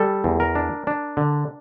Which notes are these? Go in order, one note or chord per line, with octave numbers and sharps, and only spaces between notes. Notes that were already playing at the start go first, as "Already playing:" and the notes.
Already playing: G3 A4
E2
A#4
D4
D4
D3